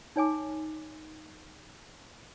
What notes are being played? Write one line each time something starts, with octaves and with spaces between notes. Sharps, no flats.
D#4 C#5 G#5 D6